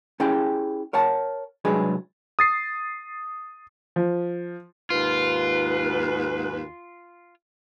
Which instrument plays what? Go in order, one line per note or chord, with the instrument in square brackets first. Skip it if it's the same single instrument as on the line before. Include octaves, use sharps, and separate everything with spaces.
[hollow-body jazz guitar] C#4 E4 G4 G#4 G5
A#4 C#5 F#5 A5
C2 F#3 G#3 D4 G#4 B4
[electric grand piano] D#6 A6 C7
[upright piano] F3
[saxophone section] D#2 G#2 B4 [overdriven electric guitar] F4